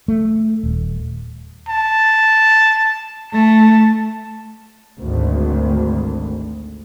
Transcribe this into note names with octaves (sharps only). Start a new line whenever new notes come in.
A3
D#1
A5
A3 A5
G#1 D2